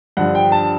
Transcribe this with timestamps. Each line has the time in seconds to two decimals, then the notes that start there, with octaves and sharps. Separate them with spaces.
0.17 G2 D3 F3 F#5
0.35 G5
0.52 A5